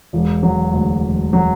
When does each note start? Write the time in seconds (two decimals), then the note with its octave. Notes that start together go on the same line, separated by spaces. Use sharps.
0.13 E1
0.43 F#3
0.73 D2
1.04 E1
1.33 F#3